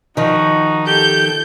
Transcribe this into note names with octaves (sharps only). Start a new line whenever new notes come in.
D#3 F3 D#4 F#4
G4 A4 G6